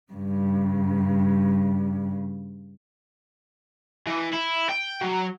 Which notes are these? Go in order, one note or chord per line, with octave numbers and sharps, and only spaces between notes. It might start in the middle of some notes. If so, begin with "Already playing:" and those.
G2 C#3
E3
E4
G5
F#3